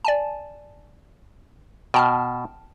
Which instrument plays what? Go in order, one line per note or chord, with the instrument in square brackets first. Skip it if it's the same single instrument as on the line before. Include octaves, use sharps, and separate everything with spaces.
[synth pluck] D5 G#5 A5
[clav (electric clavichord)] B2 [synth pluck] G5 A5 F6